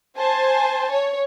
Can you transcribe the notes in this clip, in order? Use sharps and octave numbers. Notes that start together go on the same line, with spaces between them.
C5 G#5 A5
C#5